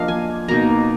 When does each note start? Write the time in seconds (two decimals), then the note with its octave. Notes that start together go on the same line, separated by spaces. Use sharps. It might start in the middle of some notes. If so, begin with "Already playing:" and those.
Already playing: F3 A#3 D4 D#5 F5
0.08 G#5
0.48 B2 A#3 D#4 A#5